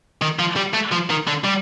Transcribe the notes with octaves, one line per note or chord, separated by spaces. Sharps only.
D#3
F3
G3
A3
F3
D#3
D3
G3